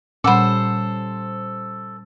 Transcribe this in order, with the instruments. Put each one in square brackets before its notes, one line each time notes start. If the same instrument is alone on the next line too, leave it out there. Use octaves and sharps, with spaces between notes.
[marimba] A#2 F#5 B5 [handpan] G3 C#4 [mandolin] A4 C5